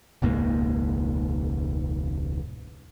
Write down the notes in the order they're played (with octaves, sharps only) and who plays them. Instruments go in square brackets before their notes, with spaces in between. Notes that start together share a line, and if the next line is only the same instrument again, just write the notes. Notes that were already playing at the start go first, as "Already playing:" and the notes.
[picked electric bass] E1 C#2 G#2 A#3